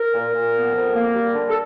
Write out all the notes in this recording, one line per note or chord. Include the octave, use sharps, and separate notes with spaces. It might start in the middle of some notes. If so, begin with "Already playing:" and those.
Already playing: A#4
A#2
A#2
B3
F2
A#3
G3
D3
A4